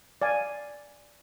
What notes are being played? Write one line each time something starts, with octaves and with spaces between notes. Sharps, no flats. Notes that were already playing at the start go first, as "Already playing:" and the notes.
D5 F5 G#5